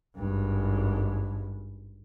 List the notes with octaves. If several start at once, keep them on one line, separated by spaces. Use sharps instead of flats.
G#1 G2